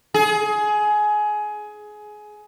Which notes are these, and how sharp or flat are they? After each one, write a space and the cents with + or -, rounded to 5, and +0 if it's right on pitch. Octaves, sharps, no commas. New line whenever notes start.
G#4 +20